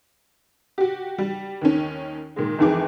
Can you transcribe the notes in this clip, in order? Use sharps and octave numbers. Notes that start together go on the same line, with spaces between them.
F#4 G4
G3
D#2 D#3 C#4
A#2 D#3 G#3
G#1 F2 E3 G#4 D6